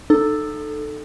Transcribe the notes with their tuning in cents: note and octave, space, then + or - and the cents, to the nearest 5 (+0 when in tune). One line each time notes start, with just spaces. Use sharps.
D#4 -35 A4 +0